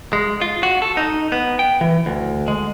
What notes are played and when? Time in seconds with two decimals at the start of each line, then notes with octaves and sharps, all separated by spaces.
0.13 G#3
0.41 F4
0.63 F#4
0.82 A4
0.97 D#4
1.32 B3
1.59 G5
1.81 E3
2.06 D2
2.48 G#3